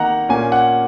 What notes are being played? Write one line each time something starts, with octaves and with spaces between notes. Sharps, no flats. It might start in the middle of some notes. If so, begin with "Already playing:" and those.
Already playing: D#3 A#3 D#4 F#5 A#5
A#2 A#3 C#4 G#5
F#5